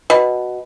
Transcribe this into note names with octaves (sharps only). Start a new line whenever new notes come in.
B2